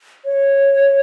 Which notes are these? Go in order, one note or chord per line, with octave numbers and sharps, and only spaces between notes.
C#5